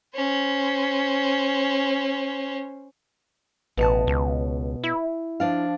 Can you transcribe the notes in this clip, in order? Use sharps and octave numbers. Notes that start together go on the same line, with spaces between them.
C#4 C5
A1 B2 A5
C#2
E4
F3 D4 F5